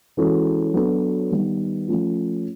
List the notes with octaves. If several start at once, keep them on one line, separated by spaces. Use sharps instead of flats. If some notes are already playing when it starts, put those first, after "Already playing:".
E3 G#3 C#4 F#4 A4
F#3 B3 D4 F#4 A4
D#3 G3 B3 D#4
F3 A3 C#4 F4